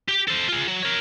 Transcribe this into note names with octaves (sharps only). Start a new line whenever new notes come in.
G4 G5
A4 C5
F4 G#4
F#3
A#4 C#5